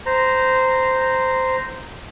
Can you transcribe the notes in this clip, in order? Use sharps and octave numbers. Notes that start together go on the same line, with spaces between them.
C5 A#5